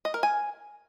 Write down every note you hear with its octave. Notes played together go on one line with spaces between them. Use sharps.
D#5
A#4
G#5